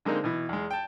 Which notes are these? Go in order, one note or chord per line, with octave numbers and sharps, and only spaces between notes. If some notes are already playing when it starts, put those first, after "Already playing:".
D3 G#3 A#3 C4 D#4
B2 E3
E2 G#3
G5 A5